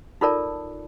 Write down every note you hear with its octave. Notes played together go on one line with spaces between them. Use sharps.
D#4 F4 A4 A#4 D5 A5